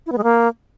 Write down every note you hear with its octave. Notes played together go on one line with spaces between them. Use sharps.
E4
B3
G#3
A#3